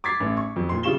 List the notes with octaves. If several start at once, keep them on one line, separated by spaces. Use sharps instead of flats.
D6 G#6 A6 B6 C7
A1
C#6
F2
A#2 C6
C#3 G3 F4 C#6 E7 G7